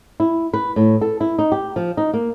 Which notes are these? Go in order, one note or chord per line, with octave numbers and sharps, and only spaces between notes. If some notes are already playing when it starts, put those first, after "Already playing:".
E4
B4
A2
A4
E4
D#4
G4
F3
D#4
A#3